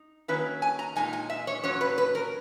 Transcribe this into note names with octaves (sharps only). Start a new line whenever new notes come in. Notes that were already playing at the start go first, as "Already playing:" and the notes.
Already playing: D#4
D#3 F#3 A#3 C#4 E4 B4
G#5
A#5
A#2 G#3 D#4 G#5
G#5
E5
C#5
A#2 F#3 C#4 C#5
B4
B4
A#4